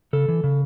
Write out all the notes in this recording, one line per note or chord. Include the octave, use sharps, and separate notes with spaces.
C#3 A4
E3
C#3